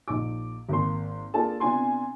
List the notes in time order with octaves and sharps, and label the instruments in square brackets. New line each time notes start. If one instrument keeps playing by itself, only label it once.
[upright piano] A#1 D#4 D6
G#1 A#3 C6
A#3 D4 F4 G#4 A4 A5
C3 B3 D4 F4 G#5 C6